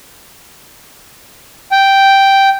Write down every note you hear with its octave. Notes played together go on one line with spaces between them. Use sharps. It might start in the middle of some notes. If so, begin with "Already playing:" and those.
G5